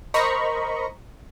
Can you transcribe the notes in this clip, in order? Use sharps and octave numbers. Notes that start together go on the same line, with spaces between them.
A#4 C5 D#5 A#5 B5 C#6